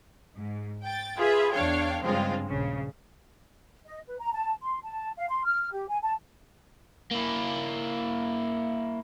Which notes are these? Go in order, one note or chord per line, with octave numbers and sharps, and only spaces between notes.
G#2
G5 A6
F4 G#4 B4 E5
E2 D4 C#5 F5 G5
G2 C#3 F3 G#3 C4 F4
A#1 C#3
D#5
B4
A#5
A5
C6
A5
F5
C6
F6
G4
G#5
A5
A#3 E4